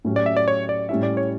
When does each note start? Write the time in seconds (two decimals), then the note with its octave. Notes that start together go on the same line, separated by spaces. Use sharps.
0.05 A2 F#3 C#4 G4
0.16 D5
0.26 E5
0.37 D5
0.48 C#5
0.69 D5
0.89 A2 G3 C#4 E4 E5
1.03 D5
1.17 C#5